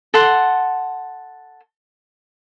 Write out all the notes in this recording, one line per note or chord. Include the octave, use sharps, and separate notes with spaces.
A4 F#5 C6